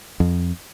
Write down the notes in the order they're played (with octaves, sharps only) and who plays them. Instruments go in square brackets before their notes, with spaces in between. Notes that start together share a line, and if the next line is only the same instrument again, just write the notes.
[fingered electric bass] F2